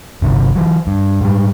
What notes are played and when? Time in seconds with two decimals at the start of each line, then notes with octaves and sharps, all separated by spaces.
0.22 G1 C3 D#3
0.56 E3 F#3
0.87 G2
1.21 G#2 G3